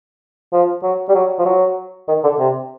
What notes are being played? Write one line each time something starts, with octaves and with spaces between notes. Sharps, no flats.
F3
F#3
G3
F#3
F3
F#3
D#3
D3
C3